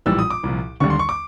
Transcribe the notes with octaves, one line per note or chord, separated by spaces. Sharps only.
A#1 A2 E3 G3 E6
D#6
D6
C2 A#2 F3
D#2 D3 G3 C#6
C6
C#6
D6